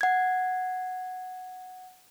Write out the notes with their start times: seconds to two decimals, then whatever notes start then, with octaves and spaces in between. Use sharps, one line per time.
0.01 F#5 G#6